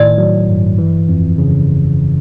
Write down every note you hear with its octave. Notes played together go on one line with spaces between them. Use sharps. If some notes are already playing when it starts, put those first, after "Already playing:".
Already playing: A2 D#3 D5
F#3
G2
E3
F2
C#3